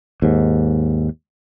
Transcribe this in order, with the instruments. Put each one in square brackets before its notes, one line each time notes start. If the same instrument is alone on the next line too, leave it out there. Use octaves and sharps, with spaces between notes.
[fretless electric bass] D#2 G#2